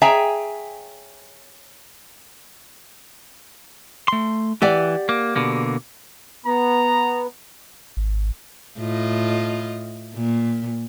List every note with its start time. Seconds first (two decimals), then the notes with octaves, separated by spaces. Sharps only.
0.02 G#4 C#5 E5 G5 G#5 A#5
4.08 A3 C6
4.62 E3 G4 D5 F#5
5.09 A#3
5.36 B2 D3 A#3
6.46 B3 A#5
7.97 G#1
8.78 A2 F4 D#5
10.14 A#2